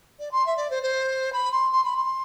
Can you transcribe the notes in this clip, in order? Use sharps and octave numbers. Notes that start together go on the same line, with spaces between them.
D5
C6
E5
D5
C5
C5
B5
C6
C6
B5
C6